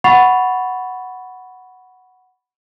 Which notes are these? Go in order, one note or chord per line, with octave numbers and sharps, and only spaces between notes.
F#5 B5 C#6 A6 C7 F7